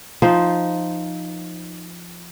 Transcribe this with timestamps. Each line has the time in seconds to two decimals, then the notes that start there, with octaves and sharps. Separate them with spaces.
0.22 F3 D#4 C5